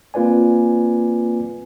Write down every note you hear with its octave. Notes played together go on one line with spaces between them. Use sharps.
A#3 C4 F4 B4 D5 G#5